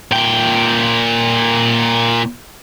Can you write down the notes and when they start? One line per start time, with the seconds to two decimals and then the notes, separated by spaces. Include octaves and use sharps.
0.12 A#2 G5